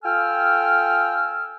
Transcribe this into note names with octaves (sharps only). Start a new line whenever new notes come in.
F4 A4 G5 G#5 E6 F6